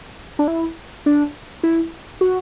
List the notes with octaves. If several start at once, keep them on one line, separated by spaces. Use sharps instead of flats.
D4
E4
D4
E4
F#4